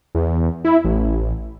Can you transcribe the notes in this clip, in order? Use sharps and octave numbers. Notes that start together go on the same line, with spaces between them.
E2
E4
A1